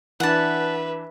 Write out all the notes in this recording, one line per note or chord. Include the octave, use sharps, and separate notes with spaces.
E3 D4 B4 E5 F#5 A5